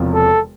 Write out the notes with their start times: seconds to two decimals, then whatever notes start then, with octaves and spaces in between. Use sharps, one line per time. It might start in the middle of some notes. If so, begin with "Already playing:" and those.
Already playing: E1 E2 C3 F3
0.14 A4